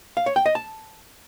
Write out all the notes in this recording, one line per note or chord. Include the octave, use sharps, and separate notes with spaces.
F5
C#5
G5
D#5
A5